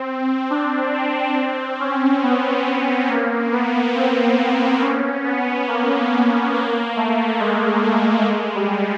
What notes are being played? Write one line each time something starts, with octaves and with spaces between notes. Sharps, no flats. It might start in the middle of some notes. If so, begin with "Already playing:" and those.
Already playing: C4
D4
C4
C4
C#4
B3
A#3
B3
C4
B3
C#4
B3
A#3
A#3
A3
G#3
A3
G#3
G3